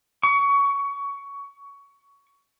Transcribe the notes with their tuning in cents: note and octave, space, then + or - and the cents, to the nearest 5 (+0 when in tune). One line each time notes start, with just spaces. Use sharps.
C#6 +20